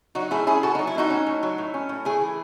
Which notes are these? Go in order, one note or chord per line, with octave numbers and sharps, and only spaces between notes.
F#3 D#4 F#4
A2 E4 G#4
C#4 E4 G#4
A2 F#4 A4
D#4
F#3
E4
A2 D#4 F#4
C#4
A2
F#3
A2
C#4
A2
A3 E4 G#4
E3